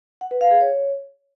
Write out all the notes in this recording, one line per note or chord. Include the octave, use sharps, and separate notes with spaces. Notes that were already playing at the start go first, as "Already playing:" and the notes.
F#5
B4
F5
G#4
C#5